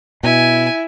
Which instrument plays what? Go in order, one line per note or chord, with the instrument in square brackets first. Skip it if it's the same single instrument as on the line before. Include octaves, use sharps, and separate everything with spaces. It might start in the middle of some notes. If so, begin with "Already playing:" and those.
[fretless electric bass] B2 [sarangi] E4 [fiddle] G#5